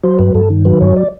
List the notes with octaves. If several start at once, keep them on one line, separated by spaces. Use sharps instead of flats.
F#3 C5
G2 B4
G2 A4
D#3
F#3 B4
G2 C#5
D5